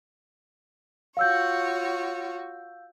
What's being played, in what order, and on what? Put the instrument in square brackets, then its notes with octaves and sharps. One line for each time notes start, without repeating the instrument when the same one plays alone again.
[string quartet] F4 F#4 C#5 [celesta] F5 E6 G6